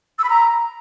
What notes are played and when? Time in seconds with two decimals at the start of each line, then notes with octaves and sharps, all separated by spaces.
0.19 E6
0.24 B5
0.30 A#5